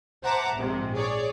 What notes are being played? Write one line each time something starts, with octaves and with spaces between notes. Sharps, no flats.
C5 E5 F#5 A5 A#5 D6
A#1 G#2 C3
G#4 C#5 D5